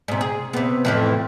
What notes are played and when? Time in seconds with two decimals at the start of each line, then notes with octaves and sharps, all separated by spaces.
0.08 G#2 C3
0.21 G#4
0.53 C3 B3
0.85 F2 A2 E3